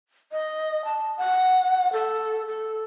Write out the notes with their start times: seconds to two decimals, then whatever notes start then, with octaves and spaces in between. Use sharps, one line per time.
0.32 D#5
0.85 A5
1.17 F#5
1.93 A4
2.47 A4